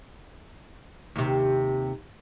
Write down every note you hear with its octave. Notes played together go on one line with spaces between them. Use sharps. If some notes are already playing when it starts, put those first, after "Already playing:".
D#2 C3